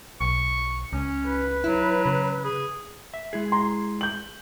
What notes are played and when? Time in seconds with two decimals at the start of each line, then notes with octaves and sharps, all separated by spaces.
0.21 B1 C#6
0.93 C#2 C#4
1.27 B4
1.64 F#3 E4
2.06 C#3
2.44 G#4
3.14 E5
3.33 G#3 E4 G#4
3.52 A#5 C6
4.01 G6 F#7